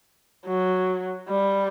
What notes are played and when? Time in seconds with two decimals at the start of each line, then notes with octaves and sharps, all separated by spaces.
0.46 F#3
1.29 G3